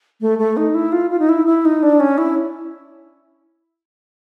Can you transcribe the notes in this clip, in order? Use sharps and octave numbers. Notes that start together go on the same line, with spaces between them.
A3
A3
D#4
E4
F4
F4
D#4
E4
E4
D#4
D4
C#4
E4